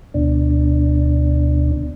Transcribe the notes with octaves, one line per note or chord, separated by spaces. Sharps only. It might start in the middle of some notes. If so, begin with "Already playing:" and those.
D2 B2 D4